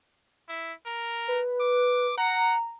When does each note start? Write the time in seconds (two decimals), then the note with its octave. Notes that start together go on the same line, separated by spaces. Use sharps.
0.48 E4
0.86 A#4
1.28 B4
1.60 D6
2.18 F#5 A#5